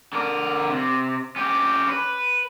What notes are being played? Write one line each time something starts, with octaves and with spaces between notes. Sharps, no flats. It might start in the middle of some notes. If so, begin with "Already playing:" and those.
D3 A#4
C3
C#4 G4
B4